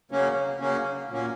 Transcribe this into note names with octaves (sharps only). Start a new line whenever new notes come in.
C#3 F#3 A#3 C#4
C#3 F#3 A#3 C#4
A#2 F#3 A#3 C#4